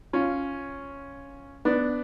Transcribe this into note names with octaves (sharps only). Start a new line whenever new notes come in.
C#4 F4
B3 D4